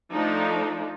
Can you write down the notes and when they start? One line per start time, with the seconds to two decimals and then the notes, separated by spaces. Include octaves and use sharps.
0.11 F3 A3 D4 D#4